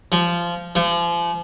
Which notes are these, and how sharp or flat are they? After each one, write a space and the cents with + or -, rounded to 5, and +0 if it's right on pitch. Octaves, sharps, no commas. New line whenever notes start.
F3 -15
F3 -35